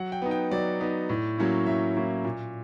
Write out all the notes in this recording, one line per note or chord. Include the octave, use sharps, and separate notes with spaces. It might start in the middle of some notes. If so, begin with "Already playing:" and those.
Already playing: F#3 F#5
G5
B3 D#4
G5
F#3 D5
B3 D#4
A2
F#3 A#3 C#4 E4
A2 E5
F#3 A#3 C#4 E4
A#2